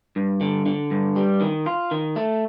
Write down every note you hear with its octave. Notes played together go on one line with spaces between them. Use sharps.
G2
D3
D3
G2
G3
D#3
F4
D#3
A3